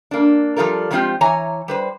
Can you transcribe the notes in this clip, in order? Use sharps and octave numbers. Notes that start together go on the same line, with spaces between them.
A#3 D4
F3 G3 F4 A4 A#4
F3 F#3 G#3 C4 F4 G4
E3 C#5 G#5 A#5
G3 B4 C5